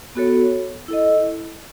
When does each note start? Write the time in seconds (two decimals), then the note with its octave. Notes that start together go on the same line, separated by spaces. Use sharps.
0.15 B3 F#4 A4 C#5
0.88 E4 A4 D#5